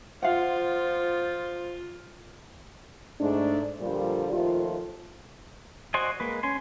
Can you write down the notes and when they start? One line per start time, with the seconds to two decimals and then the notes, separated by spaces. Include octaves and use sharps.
0.23 F3 F4 F5 F#5
3.20 G#2 A3 D4
3.81 A#2 D3 F3 G3
4.32 D#2 F3 A3 F4
5.94 F#4 C5 D5 D#5 G#5
6.20 G#3 A#3 B4
6.43 C#4 G#5 C6